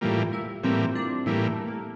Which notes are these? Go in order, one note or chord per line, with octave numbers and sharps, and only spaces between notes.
A2 E3 G3 A#3 F4
E4
A2 E3 G3 A#3 C4
D4
A2 E3 G3 A#3 E4
A3
A#3